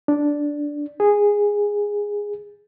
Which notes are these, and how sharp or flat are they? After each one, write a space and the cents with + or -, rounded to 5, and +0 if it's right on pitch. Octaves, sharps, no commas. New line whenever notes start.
D4 -5
G#4 -10